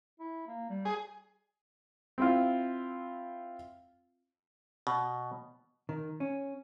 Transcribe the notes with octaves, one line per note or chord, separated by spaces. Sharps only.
E4
A#3
G3
G#4
C4 E4 F4
B2
D#3
C#4